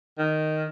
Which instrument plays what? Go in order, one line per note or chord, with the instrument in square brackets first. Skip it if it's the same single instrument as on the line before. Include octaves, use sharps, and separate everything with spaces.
[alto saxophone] D#3